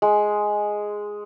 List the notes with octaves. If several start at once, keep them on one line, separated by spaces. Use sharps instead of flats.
G#3